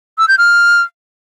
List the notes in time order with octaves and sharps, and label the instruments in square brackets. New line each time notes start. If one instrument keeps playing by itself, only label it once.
[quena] E6
G6
F6